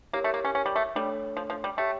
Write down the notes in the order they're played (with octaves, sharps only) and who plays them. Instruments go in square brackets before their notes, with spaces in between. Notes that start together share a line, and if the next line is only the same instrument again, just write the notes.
[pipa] A#3 [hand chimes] E4 G4 A#4 C#5
[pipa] A3
A#3
C#4
C#4
G3
A3
[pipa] G3 [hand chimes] A3 D4 A4 C#5
[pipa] F3
F3
G3
[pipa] A3 [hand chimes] G4 C#5 G5